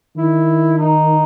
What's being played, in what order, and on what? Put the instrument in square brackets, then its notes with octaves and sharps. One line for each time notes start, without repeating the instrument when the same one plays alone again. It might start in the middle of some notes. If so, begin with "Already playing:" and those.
[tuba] D#3 [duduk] E4
[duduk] D#4